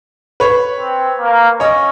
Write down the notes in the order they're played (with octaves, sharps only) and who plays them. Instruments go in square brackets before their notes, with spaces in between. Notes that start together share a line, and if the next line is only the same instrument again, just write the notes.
[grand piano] B4 C#5
[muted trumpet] C4
A#3
[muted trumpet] C#4 [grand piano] C#5 D#5